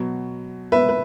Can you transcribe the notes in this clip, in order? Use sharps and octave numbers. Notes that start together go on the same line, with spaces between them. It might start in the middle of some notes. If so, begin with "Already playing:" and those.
Already playing: B2 F#3
B4 E5
B4